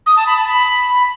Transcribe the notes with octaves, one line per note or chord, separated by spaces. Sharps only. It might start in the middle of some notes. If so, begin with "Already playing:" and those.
D#6
A5
B5
A5
B5